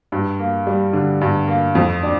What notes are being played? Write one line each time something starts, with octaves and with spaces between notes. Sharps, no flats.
G2
A#3
G3
D3
G2
A#3
F2
D4